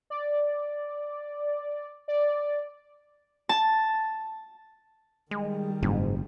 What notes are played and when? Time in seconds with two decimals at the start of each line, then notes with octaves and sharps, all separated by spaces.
0.10 D5
2.08 D5
3.49 A5
5.31 D#3 G3 G#3
5.83 F#1 G#2